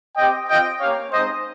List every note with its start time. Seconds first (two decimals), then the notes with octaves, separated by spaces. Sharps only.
0.17 C4 G4 D#5 G5
0.49 C4 F4 D#5 G5
0.81 A#3 C#4 G4 C#5 F5
1.12 G#3 C4 D#4 C5 D#5